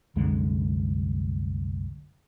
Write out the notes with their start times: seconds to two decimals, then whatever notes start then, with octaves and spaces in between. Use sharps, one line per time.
0.16 C2 F#2 D3 G#3